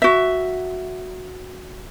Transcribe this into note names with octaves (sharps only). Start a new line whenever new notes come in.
F#4 E5